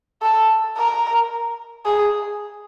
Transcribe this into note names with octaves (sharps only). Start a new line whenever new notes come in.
A4
A#4
G#4